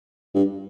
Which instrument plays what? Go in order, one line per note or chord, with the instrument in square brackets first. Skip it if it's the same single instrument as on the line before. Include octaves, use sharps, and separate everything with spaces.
[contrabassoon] G2